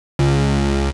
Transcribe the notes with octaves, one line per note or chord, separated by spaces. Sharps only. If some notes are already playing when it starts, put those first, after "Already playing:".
C#2